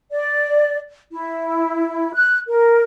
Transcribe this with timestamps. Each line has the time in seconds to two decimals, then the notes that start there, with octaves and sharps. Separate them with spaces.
0.12 D5
1.12 E4
2.14 F#6
2.48 A#4